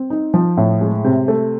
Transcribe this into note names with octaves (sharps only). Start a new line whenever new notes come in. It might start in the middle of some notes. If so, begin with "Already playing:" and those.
Already playing: C4
D#4
F3
A2
G#3
C3
A3